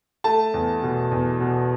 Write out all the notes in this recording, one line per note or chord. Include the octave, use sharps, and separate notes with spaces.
A3 A5
E2
B2
E2
B2